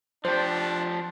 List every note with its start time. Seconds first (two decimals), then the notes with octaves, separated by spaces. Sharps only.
0.25 F3 D4 G4 C5